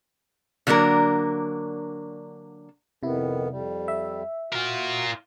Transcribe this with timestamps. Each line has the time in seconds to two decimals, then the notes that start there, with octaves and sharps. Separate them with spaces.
0.67 D3 F#3 A#3 D4 A#4
3.03 F2 C3 D#3 B3 E4
3.51 F2 G3
3.88 E5
4.52 F4 F#4 A#4